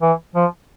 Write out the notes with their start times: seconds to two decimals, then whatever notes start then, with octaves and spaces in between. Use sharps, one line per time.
0.02 E3
0.35 F3